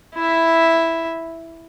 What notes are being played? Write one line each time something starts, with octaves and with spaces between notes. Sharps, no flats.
E4 E5